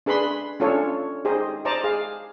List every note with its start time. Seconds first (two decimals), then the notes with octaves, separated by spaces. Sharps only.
0.06 D4 G#4 B4 B5 C6
0.60 C#4 D4 F4 A4 C#5
1.25 D#4 G4 G#4 C5 D#5
1.65 C5 D5 D#5 A5 A#5
1.84 G#4 F5